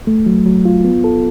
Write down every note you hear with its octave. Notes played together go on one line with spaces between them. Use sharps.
A3
F#3
F#3
F4
B3
A4